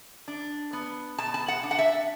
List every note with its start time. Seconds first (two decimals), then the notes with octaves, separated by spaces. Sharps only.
0.28 D4
0.73 B3
1.18 B2 A5
1.34 A5
1.48 F#5
1.63 D4
1.71 F#5
1.79 E5